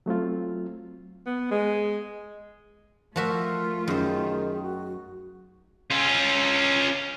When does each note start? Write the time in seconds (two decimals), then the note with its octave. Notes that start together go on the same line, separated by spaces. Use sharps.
0.06 F#3 A3 C4 F4
1.26 B3
1.51 G#3
3.16 F3 A3 F4 F#4 A#4 E5
3.88 F#2 D#3 G#4 C5
4.63 F#4
5.91 C#4 F4